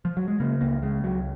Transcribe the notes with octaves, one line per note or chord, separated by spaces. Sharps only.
F3
F#3
G#3
C#3 A#3
C#2 A#3
C#3 G#3
C#2 F#3